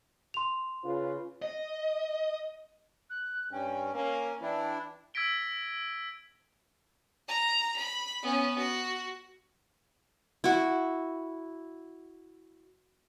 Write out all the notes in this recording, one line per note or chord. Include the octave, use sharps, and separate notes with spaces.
C6 F7
C#3 F4 B4
D#5
F#6
G2 C#4 G5
A#3 C#4 G#5
E3 D4 E4 G5
E6 G#6 A#6 B6 D7 G7
A#5
B5
B3 C#4
F#4
E4 F#4